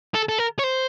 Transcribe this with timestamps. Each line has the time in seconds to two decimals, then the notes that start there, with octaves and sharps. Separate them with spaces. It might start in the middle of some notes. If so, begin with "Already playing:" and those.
0.14 A4
0.29 A4
0.38 A#4
0.59 C#5
0.64 C5